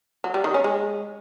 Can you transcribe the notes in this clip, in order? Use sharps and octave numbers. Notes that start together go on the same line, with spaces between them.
F#3
G3
D#3
C#4
G#3